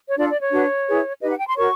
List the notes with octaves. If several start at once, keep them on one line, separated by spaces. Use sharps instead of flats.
C#5
D4 F4 A4 D5
D5
C#5
D4 F#4 B4
E4 G#4 B4
D#4 G4 B4 D#5
F#5
G5
C6
F#4 A#4 C#5 C#6